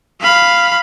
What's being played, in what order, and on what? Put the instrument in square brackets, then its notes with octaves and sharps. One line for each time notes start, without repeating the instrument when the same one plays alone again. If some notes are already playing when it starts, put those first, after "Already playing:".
[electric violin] F5 B5